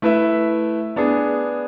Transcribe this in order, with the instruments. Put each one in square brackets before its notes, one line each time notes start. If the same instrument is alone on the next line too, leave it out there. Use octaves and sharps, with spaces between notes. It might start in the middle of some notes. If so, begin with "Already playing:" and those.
[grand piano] A3 E4 B4 E5
B3 D4 G#4